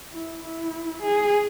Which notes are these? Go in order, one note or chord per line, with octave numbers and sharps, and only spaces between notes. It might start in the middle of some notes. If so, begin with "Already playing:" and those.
E4
E4
G#4